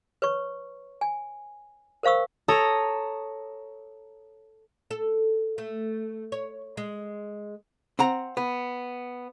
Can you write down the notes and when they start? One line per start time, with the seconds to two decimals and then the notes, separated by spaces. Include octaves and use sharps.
0.22 B4 C#5 C#6
1.01 G#5
2.03 A#4 C5 F5 C#6 E6
2.48 A4 C#5 A#5 D#6
4.91 A4
5.58 A3
6.32 C#5
6.77 G#3
7.99 C4 F#5 A#5
8.37 B3